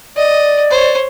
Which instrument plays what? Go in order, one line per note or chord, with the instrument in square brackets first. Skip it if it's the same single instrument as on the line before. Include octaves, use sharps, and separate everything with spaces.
[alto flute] D5 [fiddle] D#5
[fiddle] C5 C#5